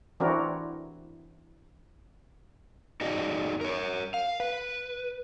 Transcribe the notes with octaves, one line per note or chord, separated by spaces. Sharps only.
E3 C4 D4 E4 F#4 A#4
D#4 F#4 G#4 D5 D#5
A#4 C#5
F5
B4